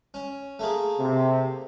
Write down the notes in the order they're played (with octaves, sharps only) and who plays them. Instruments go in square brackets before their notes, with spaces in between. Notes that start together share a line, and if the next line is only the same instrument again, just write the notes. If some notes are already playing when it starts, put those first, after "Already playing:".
[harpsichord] C#4
A3 A#3 G#4
[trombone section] C3